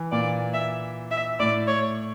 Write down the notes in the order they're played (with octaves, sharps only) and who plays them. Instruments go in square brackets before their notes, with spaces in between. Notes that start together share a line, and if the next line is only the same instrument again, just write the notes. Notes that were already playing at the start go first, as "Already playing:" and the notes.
Already playing: [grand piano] E3
[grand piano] A#2 [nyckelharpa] D5
[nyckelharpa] E5
E5
[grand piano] A2 [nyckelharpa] D5
[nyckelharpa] C#5